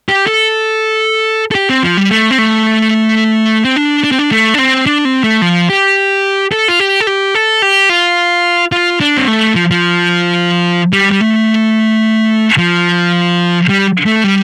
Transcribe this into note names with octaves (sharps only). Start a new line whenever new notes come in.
G4
A4
A4
G4
C4
F3
G3
A3
C4
A3
C4
D4
D4
C4
D4
A3
D4
C4
D4
C4
A3
F3
G4
A4
F4
G4
A4
G4
A4
G4
F4
F4
D4
C4
A3
F3
F3
G3
G3
A3
F3
G3
A3
G3